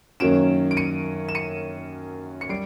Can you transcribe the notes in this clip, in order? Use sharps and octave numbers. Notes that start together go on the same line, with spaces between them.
F#2 D#3 F#3 A#3 C#4 D7 E7
D7
C#7 D#7
E7
C#7 D#7
C#7
G3 C7 D7